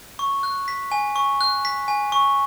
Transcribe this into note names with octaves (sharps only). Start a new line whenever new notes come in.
C#6
F#6
B6
G#5
C#6
F#6
B6
G#5
C#6